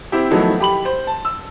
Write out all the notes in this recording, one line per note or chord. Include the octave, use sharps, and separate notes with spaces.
C4 E4 G4
D#3 F3 F#3 A3 B3 E4
G4 B5 F#7
C5
A5
E6